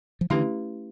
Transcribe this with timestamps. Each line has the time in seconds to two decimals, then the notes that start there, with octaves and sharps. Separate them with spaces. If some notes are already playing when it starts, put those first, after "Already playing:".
0.21 F3
0.30 D3 E3 A3 C#4 E4 G4 B4